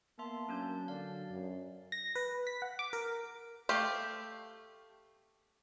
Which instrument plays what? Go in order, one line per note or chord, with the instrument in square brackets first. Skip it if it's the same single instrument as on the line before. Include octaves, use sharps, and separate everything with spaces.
[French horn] A#3 [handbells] B3 E5 C6 [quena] A5
[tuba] F#3 [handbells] C#4 D4 G6
[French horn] D3 [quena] D5 [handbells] F5
[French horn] F#2
[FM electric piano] A#6
B4
B6
F#5
D6
A#4
[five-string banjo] A3 G4 F5